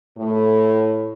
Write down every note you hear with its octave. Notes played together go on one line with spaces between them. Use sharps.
A2